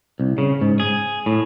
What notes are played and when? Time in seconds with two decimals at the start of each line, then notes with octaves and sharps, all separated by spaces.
0.20 C2
0.38 C#3
0.61 G#2
0.80 G#4
1.26 A2